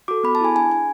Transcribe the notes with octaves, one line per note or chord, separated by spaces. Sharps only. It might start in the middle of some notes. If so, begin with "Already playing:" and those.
F#4 A4 D6
B3 B5
A5
E4 G#4 G#5
D4 G#5
G#4 G#5